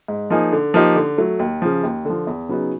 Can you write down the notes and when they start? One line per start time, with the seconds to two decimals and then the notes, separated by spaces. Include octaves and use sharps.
0.08 G#2
0.30 F3 A#3 D#4 G#4
0.52 D3
0.74 F3 A#3 D#4 G4
0.96 D3
1.18 F#3 A3
1.39 D#2
1.62 C#3 F3
1.83 D#2
2.05 D3 F3
2.27 E2
2.49 C#3 F#3 B3 D#4